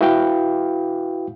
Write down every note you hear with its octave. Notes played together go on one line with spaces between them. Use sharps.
E4 F#4 B4 F5 G5